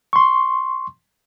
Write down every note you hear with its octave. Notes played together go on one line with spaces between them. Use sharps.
C6 C#6